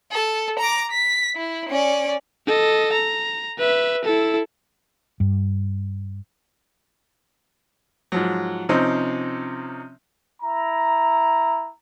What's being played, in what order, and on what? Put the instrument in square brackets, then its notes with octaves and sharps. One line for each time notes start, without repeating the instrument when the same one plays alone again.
[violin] A4
A#5 D6
B6
E4
C#4 D5
[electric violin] A4 D#5
A#5
B4 E5
E4 A4
[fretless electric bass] G2
[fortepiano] G#2 F3 F#3
C3 F3 C4 C#4 D#4
[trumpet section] E4 A#5